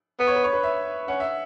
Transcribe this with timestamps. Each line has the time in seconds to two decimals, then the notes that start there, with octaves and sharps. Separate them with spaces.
0.19 B3 B4
0.27 C#5
0.36 B4
0.44 C#5
0.53 B4
0.63 E5
1.08 C#4 F#5
1.20 E5